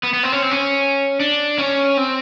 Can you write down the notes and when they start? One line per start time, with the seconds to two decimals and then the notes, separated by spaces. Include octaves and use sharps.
0.03 B3
0.13 B3
0.23 C4
0.32 C#4
0.42 C4
0.51 C#4
1.20 D4
1.58 C#4
1.97 C4